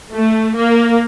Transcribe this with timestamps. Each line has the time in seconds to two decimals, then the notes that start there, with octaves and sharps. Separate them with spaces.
0.12 A3
0.55 A#3